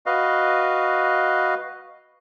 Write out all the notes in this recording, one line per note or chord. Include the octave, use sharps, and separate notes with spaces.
F#4 B4 D#5 F5